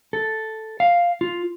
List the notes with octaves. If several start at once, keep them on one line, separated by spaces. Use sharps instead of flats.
A4
F5
F4